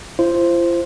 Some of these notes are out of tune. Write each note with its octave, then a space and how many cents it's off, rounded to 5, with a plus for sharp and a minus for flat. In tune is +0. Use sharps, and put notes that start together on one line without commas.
F4 -40 C5 +0